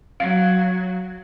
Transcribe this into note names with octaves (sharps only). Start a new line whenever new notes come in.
F#3 F5